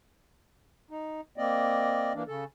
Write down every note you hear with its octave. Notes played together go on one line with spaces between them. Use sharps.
D#4
A#3 C4 D5 D#5
E3 A#3 D4
C#3 A4